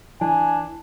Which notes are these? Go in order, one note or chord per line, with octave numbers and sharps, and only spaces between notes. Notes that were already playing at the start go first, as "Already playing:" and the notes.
E3 D4 G#5